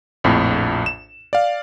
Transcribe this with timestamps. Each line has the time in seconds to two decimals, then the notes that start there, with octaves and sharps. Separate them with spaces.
0.24 A#1 F2 A2
0.86 E7
1.33 D5 F5